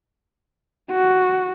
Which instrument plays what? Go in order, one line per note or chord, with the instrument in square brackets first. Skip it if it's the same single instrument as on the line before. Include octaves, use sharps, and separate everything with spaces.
[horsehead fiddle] F#4